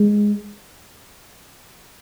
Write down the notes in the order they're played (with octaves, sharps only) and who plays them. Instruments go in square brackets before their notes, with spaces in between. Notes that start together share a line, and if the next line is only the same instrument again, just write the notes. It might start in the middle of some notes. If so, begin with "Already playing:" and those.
Already playing: [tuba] G#3